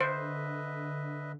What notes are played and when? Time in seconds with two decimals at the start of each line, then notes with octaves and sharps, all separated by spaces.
0.01 D3 B4 C5 D#5 E5